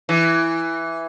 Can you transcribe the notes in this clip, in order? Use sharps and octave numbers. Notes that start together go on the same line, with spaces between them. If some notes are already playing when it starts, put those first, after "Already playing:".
E3